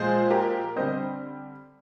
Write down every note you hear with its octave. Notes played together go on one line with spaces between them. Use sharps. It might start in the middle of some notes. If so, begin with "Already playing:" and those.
Already playing: A#2 F3 G#3 G#4 C5
G4 A#4
D3 G3 C4 C5 D#5